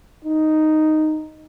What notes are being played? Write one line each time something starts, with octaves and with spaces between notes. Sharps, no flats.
D#4